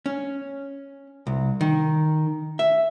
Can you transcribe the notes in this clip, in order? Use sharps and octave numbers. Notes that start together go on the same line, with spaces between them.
C#4
C2
D#3
E5